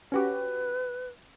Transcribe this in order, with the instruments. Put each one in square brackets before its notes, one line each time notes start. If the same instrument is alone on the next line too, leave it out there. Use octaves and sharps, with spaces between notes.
[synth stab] C#4 F#4 G4 [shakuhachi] B4